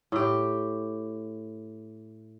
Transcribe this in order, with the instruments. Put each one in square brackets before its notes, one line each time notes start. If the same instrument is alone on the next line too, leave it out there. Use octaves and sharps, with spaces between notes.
[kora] A2 G4